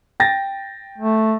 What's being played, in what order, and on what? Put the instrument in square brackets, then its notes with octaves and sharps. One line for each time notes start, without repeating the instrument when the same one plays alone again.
[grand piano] G5 A6 A#6
[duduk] A3